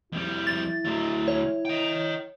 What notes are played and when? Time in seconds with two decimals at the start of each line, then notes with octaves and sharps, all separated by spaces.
0.12 F2 G3 E4
0.47 A6
0.85 D2 F#3
1.28 C#5
1.65 D#5 G5